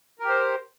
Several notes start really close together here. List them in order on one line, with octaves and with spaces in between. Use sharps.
A#4 G4 C5